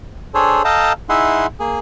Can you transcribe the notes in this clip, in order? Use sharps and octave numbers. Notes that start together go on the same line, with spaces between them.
D4 G#4 A4 C5 C#5
A4 D#5 F5 G5 A5 A#5
D#4 E4 G#4 E5 F#5 C6
A#3 G#4